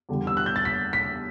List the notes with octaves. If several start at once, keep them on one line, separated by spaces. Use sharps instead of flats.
E2 D3 G3
E6
F#6
G6
A6
B6
B6